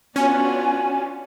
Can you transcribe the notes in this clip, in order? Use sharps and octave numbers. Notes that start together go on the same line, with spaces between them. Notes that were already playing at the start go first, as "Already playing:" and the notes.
B3 C#4 D4 F4 F#4 G#5